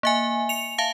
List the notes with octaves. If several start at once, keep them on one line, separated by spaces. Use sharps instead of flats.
A#3 E5 G#5
C#7 F7
E5 F5 A5